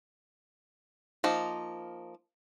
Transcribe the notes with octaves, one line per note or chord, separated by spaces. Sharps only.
F3 A#3 D#4